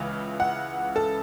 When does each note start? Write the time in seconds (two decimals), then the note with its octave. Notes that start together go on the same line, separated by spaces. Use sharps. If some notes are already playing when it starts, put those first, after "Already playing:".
Already playing: C#2 C#3 E3
0.40 F#5
0.96 A4